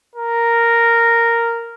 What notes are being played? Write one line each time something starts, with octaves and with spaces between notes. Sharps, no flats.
A#4